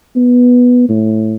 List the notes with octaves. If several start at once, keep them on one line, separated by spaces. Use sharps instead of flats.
B3
A2